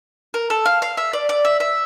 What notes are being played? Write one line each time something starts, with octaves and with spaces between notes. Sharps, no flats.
A#4
A4
F5
F5
E5
D5
D5
E5
E5